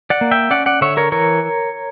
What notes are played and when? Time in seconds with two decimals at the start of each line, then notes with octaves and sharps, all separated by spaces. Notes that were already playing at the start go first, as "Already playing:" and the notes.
0.10 D5 F#5
0.21 A#3
0.31 E5 G5
0.51 C#4 D5 F#5
0.66 D5 F#5
0.81 D3 C#5 E5
0.97 A#4 C#5
1.12 E3 A#4 C#5